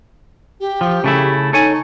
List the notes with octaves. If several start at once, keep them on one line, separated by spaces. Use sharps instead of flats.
G4
F3
C#3 A3 E4
D#4 A4 C#5 G#5